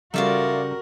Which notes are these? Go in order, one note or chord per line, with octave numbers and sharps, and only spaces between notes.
C#3 G3 F4 F#4 A4 A#4 D5 E5